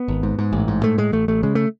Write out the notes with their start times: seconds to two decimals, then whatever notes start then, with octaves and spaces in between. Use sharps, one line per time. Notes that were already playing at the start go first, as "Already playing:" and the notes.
Already playing: B3
0.08 G#1
0.23 G#2
0.39 G#2
0.53 A1
0.68 G#2
0.83 A2 A3
0.98 A2 G#3
1.12 A1 A3
1.28 A1 A3
1.43 C#3 G#3
1.55 A3